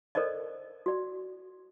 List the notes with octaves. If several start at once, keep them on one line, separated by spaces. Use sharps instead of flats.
A4 A#4 C5 D5 D#5
F#4 D5